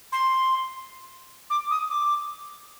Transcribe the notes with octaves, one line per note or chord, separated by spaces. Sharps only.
C6
D6
D#6
D6